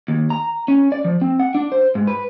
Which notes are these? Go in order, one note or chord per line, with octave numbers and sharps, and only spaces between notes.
D#2
A#5
C#4
D5
F3
C4
F#5
D4
C5
G#2
B4